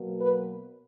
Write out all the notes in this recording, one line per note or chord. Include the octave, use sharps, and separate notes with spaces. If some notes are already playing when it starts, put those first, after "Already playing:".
Already playing: B2 F#3 A#3
B4